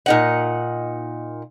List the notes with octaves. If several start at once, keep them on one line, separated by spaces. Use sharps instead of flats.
A#2 D#4 F#5